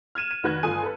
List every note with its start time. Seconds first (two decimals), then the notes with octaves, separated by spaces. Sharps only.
0.15 F6 G#6 D#7 E7
0.31 D#7
0.43 F1 D#3 F#4 B4 F#6 G#6
0.63 G1 F4 A4 G#5 D#6 D#7
0.83 A4 B4